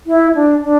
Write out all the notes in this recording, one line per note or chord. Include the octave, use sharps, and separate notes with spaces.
E4
D4
D4